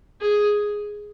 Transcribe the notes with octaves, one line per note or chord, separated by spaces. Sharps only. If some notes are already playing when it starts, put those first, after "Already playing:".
G#4